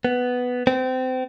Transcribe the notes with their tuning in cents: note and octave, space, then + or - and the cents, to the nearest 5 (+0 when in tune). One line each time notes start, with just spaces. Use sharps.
B3 +5
C4 -30